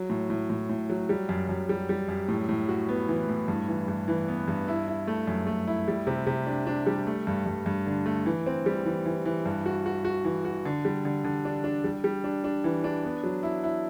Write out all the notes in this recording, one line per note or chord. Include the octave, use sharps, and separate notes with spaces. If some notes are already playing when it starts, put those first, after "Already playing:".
Already playing: F#3
A2
A2
A2
A2
F#3
G3
F#2
F#2
G3
G3
F#2
A2
A2
F#4
B3
E3
A2
G2
E3
G2
E3
B3
G2
E4
E4
A3
F#2
A3
E4
G3
C3
C3
D4
D4
G3
A3
G2
G2
G2
D3
A3
E3
C4
G3
E3
E3
E3
G2
F#4
F#4
F#4
E3
F#4
D3
G3
D3
D3
D4
D4
G3
G3
D4
D4
E3
D4
B3
F#3
E4
E4